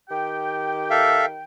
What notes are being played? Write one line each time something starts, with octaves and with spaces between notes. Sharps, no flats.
D#3 G4 G5
A4 E5 F5